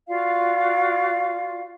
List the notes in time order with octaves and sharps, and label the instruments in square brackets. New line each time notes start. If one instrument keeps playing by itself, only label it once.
[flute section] F4 F#4 D5 F5